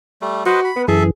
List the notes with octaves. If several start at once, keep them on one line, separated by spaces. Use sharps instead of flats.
G3 A3
F#4 B4 C5 D#5
B5
B3 B4
F#2 E3 G#4 A4 E5